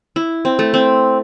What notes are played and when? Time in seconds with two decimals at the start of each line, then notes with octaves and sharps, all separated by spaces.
0.16 E4
0.45 C4
0.59 A3
0.74 C4